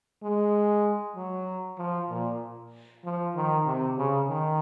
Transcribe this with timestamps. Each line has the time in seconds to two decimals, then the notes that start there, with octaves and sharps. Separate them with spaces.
0.23 G#3
1.16 F#3
1.78 F3
2.10 A#2
3.04 F3
3.35 D#3
3.66 C3
3.98 C#3
4.29 D#3